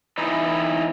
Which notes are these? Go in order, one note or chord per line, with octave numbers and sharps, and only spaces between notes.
E3 B3 D#4 E4